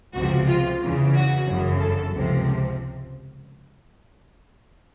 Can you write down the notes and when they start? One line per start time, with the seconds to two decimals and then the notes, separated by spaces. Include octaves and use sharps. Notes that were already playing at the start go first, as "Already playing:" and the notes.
0.14 C#2 C3 F3 F#4
0.48 F4
0.80 E2 C#3 E3
1.14 F#4
1.47 G1 F#2 C#3 E3
1.80 A4
2.13 C#2 C3 F3